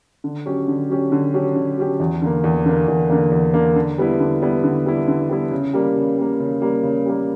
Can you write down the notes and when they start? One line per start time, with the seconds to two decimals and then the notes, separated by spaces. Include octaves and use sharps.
0.24 D3
0.46 F#3 C#4 G4
0.68 D3
0.89 F#3 C#4 G4
1.12 D3
1.34 F#3 C#4 G4
1.56 D3
1.78 F#3 C#4 G4
2.00 E2
2.22 D3 A#3
2.44 E2
2.66 D3 A#3
2.88 E2
3.10 D3 A#3
3.31 E2
3.54 D3 A#3
3.76 D3
3.98 G3 B3 E4
4.20 D3
4.42 G3 B3 E4
4.64 D3
4.86 G3 B3 E4
5.08 D3
5.29 G3 B3 E4
5.52 C#3
5.74 G3 A#3
5.96 C#3
6.18 G3 A#3
6.40 C#3
6.62 G3 A#3
6.83 C#3
7.06 G3 A#3